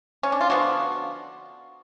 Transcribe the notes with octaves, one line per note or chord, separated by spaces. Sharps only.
C#4
D4
F4
D3 F3 B3 F#4